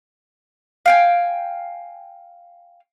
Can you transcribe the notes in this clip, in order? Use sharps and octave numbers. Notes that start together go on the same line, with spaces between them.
F5 G5 G#5